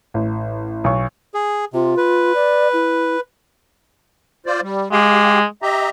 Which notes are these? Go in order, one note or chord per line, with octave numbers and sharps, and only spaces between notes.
A1
B1 C#6
G#4
C3 F4
B4
D5
E4
F4 C5 D5
G3
G#3 G4 F5 G5
G4 D#5 E5 A#5